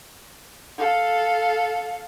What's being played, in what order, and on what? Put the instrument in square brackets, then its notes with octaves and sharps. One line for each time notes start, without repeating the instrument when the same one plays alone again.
[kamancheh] A4 F5